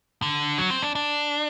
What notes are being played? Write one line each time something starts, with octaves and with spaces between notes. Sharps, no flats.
D3
F#3
C4
D4
D4